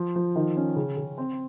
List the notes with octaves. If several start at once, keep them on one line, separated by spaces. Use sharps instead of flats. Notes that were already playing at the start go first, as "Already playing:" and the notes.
Already playing: F3
F3
D#3
C#4
C#3
C#3
C4